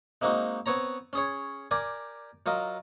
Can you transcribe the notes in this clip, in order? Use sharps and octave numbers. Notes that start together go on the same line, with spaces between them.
G#3 A#3 C4 D#4 F#4
B3 C4 C#5 A#5
C#4 G#4 C#5
G4 A#4 D5 G#5
F#3 F4 A#4 D#5